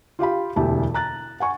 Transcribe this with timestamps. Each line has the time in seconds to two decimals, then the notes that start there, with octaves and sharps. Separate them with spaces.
0.19 F4 G4 F5 B5
0.56 E1 D2 E4 G4 A5
0.94 A#5 F#6 A6
1.40 F#5 G#5 C#6